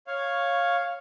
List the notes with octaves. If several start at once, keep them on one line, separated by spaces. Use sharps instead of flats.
C#5 F5